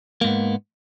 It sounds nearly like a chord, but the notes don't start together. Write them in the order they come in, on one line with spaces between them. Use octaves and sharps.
A#3 G#2 B3